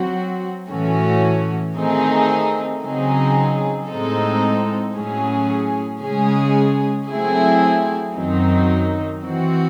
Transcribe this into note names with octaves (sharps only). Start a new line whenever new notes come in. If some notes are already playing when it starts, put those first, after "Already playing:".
Already playing: F#3 C4 F#4
A2 E3 A3 C#4 F#4
D#3 A3 C4 D#4 G#4
C#3 F#3 C4 D#4 G#4
A2 G#3 C4 D#4 A4
A2 F#3 C#4 G#4
C#3 G#3 C#4 G#4
F#3 A3 C4 E4 G#4
F#2 D#3 F#3 C4 D#4
E3 C4 F#4